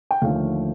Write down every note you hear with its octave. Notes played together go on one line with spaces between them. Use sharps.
G5
D#2 D3 F3 A3 F5